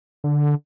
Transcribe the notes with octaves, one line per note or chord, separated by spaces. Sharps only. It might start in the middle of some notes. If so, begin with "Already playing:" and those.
D3